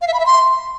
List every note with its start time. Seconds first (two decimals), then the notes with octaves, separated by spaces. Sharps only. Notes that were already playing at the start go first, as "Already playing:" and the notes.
0.02 F5
0.08 E5
0.14 B5
0.20 E5
0.26 C6